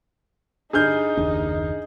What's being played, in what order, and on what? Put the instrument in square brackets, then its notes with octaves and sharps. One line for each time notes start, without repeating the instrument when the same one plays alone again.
[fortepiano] G2 D3 [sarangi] D#4 [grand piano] G#4 F6 G6
[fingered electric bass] F#1 D#2 D4